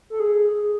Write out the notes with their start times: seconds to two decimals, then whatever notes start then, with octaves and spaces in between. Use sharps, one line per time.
0.10 A4
0.20 G#4